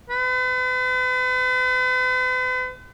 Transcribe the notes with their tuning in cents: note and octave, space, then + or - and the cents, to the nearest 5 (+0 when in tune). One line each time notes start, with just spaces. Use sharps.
B4 +45